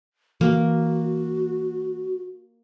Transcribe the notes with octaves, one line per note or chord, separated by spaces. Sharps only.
E3 A#3 F#4